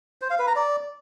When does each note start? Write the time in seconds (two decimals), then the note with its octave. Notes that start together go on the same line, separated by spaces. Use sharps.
0.22 C5
0.30 F5
0.39 B4
0.47 A#5
0.56 D5